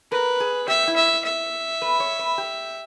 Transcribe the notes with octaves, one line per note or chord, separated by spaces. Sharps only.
A#4 B4
G#4
G4 E5
E4
E5
E5
B4
C#5
B4
G4